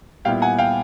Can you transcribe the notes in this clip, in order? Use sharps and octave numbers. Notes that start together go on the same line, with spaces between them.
A#2 G3 B3 E4 F5 G5
F#5 G#5
F5 G5